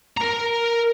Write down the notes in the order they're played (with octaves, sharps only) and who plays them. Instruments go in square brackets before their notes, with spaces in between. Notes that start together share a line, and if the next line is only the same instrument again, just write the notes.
[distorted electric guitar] A#4 A#5